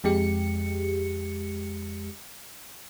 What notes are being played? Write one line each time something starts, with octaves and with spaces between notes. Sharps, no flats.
F2 G#3 G4 C#7